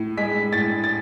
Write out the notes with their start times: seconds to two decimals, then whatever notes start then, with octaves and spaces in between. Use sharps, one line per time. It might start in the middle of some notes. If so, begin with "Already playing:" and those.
Already playing: A2
0.18 G#3 B6
0.53 A2 A6
0.84 A6